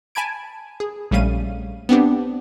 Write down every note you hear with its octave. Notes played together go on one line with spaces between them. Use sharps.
G#5 A5 B5 G#6 D7
G#4
A#1 G3 A3 C#4 F5 D#7
B3 C4 D4 G4